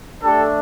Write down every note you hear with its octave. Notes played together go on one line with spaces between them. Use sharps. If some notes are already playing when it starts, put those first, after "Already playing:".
A3 D4 G4 A4